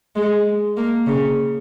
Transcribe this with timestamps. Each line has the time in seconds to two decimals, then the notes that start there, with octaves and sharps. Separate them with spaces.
0.16 G#3
0.77 A#3
1.07 C#3